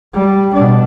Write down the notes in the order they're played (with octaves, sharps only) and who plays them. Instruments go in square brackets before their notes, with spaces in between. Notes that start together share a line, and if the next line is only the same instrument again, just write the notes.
[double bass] G3
B2 D4